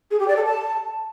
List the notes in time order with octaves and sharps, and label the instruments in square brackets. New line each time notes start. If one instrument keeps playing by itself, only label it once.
[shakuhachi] G#4
G4
D5
A4
A5